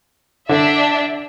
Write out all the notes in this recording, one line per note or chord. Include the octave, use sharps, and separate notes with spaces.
D3 D4 E5